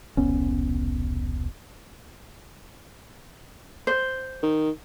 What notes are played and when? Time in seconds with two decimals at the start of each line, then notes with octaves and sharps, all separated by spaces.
0.17 E1 C2 B3 C#4
3.87 C5
4.43 D#3